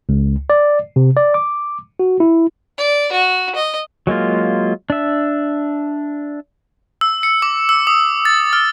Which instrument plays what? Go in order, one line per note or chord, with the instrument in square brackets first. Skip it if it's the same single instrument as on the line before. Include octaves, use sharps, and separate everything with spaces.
[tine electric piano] C#2
D5
C3
D5
D6
F#4
E4
[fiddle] D5
F#4
D#5
[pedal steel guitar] F#3 G#3 A#3 F4
D4 E5
[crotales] E6
C#7
D6
E6
D#6
A6
F6